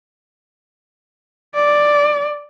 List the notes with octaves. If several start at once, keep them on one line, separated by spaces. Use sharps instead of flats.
D5